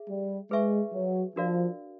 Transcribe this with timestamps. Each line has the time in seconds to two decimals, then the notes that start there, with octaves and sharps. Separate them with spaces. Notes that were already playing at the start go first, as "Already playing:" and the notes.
Already playing: G#4 E5
0.09 G3
0.51 G#3 G#4 B4 E5 G#5 C#6
0.93 F#3
1.36 F3 D4 F#4 A#4 D5 F5